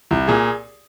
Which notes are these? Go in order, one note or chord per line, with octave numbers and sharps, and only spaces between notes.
C2
A#2 G#4